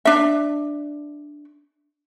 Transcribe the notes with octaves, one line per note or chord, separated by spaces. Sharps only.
D4 E5